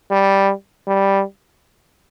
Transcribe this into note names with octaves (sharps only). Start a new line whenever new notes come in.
G3
G3